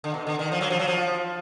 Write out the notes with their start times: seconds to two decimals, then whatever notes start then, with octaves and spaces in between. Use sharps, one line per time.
0.04 D3
0.14 B2
0.27 D3
0.39 D#3
0.52 F3
0.61 F#3
0.70 F3
0.79 F#3
0.88 F3